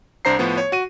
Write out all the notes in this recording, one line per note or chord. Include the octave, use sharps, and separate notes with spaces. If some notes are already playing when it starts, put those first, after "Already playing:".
C2 D4 C5 A#5 C7
A2 F3 B3
C#5
F#4 D#7